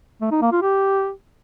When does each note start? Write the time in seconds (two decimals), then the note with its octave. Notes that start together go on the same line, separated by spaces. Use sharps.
0.21 A3
0.31 D#4
0.42 A#3
0.52 F4
0.62 G4